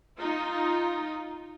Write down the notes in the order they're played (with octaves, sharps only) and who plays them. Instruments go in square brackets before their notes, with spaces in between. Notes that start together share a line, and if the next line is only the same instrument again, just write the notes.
[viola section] D#4 F4